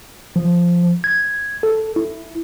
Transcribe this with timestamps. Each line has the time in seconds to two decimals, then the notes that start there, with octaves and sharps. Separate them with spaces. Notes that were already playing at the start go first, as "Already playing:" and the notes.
0.36 F3
1.04 G#6
1.63 A4
1.96 E4